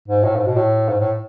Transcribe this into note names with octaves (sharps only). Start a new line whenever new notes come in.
G#2
A2
G#2
B2
A2
G#2
A2